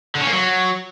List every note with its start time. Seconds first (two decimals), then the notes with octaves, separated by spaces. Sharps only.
0.15 D3
0.21 C#4
0.27 A#3
0.33 F#3